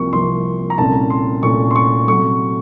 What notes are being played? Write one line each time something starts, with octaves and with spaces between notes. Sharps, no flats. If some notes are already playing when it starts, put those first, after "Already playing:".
Already playing: C2 C3 F3 A#3 C#6
C2 C3 F3 A#3 C6
A#5
C2 A#2 A3 C#4 A5
C6
C2 A#2 A3 C#4 C#6
C6
C#6
C3 F#3 A3 C#6